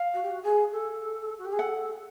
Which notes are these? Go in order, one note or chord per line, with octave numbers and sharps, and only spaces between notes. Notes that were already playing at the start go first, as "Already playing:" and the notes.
Already playing: F5
F#4
G4
F#4
G#4
A4
F#4
G4
G#4
A4 F#5